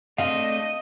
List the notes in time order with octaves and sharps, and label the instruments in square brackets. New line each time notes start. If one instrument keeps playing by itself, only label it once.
[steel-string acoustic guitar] A3 C4 D4 [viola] D#5 [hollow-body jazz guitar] F5